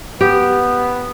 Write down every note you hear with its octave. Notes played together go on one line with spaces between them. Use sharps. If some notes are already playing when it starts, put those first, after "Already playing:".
B3 G4